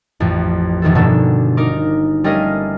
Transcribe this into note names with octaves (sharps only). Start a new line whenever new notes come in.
A1 F2
F1 F2 D#3 E3 A4
G1 B2 A#3 D4 F#4 A4
D#4 A#4 D6
G3 A3 C#4 A#4 D#5 F5